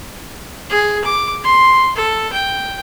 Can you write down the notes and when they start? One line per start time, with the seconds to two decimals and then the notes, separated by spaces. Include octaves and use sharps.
0.70 G#4
1.04 D6
1.43 C6
1.96 A4
2.32 G5